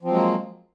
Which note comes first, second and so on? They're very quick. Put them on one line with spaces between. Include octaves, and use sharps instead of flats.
F3 C4 F#3 G#3 A#3